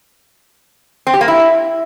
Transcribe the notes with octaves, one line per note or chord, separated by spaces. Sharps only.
C4
G4
A#3
E4